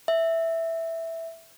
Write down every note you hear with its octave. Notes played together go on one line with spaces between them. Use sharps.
E5